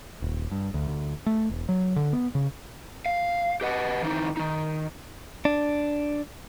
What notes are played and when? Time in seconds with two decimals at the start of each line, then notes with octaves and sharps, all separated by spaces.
0.22 D#1
0.51 G2
0.74 D2
0.88 D2
1.26 A3
1.50 E1
1.69 F#3
1.96 D3
2.13 B3
2.35 C#3
3.06 F5
3.61 G4 B4 D#5 F#5
4.02 D#3 E3 C4 D#4
4.37 D#3 D#4
5.45 D4